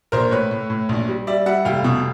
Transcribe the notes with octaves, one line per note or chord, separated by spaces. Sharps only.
A#1 A#4 C5
A2 B4 C#5
A2
A2
A#1
G3
G3 D5 E5
G3 E5 F#5
F1 F5 G5
B2